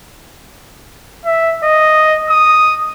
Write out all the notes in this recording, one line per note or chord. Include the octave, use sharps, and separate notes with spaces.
E5
D#5
D#6